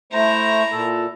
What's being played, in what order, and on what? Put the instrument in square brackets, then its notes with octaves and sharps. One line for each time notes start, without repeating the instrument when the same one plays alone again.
[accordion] A3 [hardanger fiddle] E4 A#5 [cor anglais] C5
[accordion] A#2 [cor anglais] A4